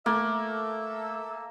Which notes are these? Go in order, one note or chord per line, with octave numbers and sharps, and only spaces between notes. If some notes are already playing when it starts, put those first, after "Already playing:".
A3 A#3 A4 E5